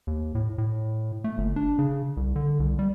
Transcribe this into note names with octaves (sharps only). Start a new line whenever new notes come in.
D#2
A2
A2
A3
G1
D4
C#3
C2
D3
C2
G3